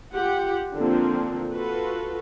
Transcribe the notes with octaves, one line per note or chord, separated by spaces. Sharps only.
F4 G4 F#5
D3 F3 A#3 C4
F4 F#4 A4 B4